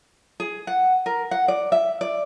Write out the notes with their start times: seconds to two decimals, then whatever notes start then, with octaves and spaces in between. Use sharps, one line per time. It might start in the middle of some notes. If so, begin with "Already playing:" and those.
0.40 G#4
0.67 F#5
1.06 A#4
1.31 F#5
1.48 D5
1.72 E5
2.01 D5